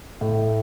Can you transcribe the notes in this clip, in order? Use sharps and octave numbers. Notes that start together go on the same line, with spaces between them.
A2